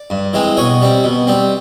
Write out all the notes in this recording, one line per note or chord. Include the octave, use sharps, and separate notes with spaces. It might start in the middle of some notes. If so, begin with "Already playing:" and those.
Already playing: D5
G2
E3 G#3 C4
B2 C#5 D#5
G3 C4
B2
G3 C4